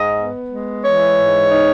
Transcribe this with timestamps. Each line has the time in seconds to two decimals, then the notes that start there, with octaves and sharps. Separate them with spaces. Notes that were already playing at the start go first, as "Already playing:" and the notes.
Already playing: G#2 D#5
0.17 B3
0.49 G#3
0.83 E3 C#5
1.17 G#2
1.51 D#4